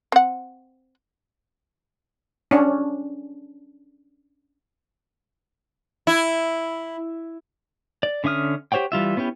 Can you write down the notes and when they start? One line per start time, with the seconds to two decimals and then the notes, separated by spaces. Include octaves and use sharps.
0.12 C4 F#5
2.51 C#4 D4
6.07 E4
8.03 D5
8.24 D3 C#4 E5 D#6 F6
8.72 G4 C5 C#5 F#5 G5
8.92 E3 G3 F4 E5
9.17 B3 C#4 E4 G4